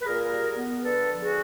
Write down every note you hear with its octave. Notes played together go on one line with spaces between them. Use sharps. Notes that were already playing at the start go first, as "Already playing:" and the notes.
B4
A#2 G#4 A#4
G3
B3
D3 A4 B4
F3
F#4 G#4